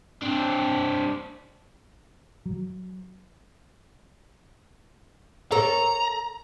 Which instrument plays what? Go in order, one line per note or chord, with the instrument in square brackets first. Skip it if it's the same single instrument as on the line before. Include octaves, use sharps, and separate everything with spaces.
[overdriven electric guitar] C4 D4
[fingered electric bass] F#3
[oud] A4 A#4 C#5 [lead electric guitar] A#5